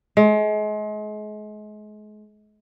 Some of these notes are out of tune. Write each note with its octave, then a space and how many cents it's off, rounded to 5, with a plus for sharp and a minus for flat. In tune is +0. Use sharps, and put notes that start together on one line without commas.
G#3 +35